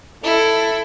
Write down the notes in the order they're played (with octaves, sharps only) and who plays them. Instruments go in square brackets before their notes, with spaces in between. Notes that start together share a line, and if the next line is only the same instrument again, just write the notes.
[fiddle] E4 [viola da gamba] A4